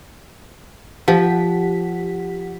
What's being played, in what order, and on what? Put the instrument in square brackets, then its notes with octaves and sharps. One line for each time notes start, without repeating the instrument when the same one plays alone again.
[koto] F3 [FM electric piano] G4 F#5 B6